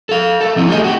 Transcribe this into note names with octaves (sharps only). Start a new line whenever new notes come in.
A4 F5
A3 A4
F3 C4 D#4 E4
A3 G4 G#4 D#5
F#4 G4